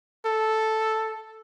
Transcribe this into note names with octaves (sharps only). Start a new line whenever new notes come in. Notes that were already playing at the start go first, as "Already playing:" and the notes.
A4